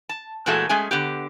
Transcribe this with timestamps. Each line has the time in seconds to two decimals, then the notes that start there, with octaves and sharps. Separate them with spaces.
0.09 A5
0.46 A#2 E3 G#3 A3 F#4 A4
0.69 G#3 A3 C#4 G#4 G#5
0.91 D3 B3 G4